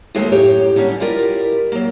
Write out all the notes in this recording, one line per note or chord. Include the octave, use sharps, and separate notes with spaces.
D#2 D#3 F#3 G#3 A3 F4
F#2 A2 G4 C#5
D3 F#3 G3 C#4
E4 F4 G4 A#4 D5
F#3 A#3